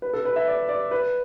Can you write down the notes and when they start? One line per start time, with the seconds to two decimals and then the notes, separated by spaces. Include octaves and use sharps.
0.02 B4
0.13 A4
0.25 B4
0.36 E5
0.48 D5
0.69 D5
0.91 B4